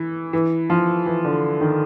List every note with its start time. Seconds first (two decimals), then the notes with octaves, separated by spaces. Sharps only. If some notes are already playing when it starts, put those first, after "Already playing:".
Already playing: E3
0.33 E3
0.70 F3
1.06 E3
1.25 D3
1.61 D#3